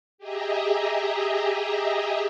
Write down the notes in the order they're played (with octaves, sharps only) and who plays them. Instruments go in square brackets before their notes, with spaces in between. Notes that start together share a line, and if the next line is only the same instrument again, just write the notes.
[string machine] G4 G#4 D#5 E5 A#5